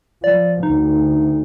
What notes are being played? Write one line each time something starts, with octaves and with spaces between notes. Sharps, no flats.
F3 D5
D2 D#4